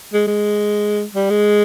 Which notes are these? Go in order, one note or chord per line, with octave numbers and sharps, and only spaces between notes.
G#3
G#3
G3
G#3